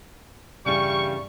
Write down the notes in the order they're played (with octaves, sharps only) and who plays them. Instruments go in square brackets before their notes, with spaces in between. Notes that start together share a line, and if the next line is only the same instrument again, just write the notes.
[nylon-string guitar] E2 G2 C#3 [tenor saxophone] G3 [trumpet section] C#6